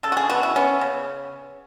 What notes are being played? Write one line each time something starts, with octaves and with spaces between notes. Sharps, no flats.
C#3 A4
F#4
G#4
B3 F#4
E4
B3 C#4
C#3